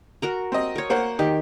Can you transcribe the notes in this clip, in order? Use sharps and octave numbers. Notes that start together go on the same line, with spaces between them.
F#4 A#4 A#5
C4 D#5
A#4 C#5
A#3 C5 F#5
D#3 G4